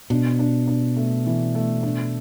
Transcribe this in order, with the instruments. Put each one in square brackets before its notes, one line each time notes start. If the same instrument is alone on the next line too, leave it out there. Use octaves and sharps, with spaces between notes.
[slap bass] B2 [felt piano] D4
[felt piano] D4
D4
A3
E3
A3
D4